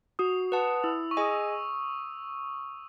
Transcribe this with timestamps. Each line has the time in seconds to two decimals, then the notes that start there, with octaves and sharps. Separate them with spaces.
0.19 F#4 D#6
0.52 B4 F#5 A5
0.84 E4 E6
1.11 C#6
1.17 G#4 D#5 G#5 D#6
1.31 E6